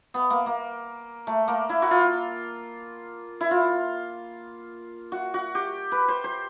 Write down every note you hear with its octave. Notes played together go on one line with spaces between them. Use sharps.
B3
A#3
A#3
A3
A#3
E4
F#4
F4
E4
F4
F#4
F#4
G4
B4
C5
C5